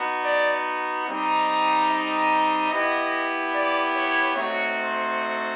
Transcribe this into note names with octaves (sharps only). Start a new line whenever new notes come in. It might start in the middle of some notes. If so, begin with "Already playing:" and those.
Already playing: B3 D#4 F#4
D5
G3 C4 D#4
D#5
B3 E4 G4 D#5
D5
C#5
A3 C4 D#4 F#4 C#5
C5